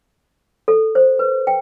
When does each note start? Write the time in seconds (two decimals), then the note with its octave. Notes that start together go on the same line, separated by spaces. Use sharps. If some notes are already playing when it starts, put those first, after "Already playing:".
0.68 A4
0.95 C5
1.19 B4
1.47 G5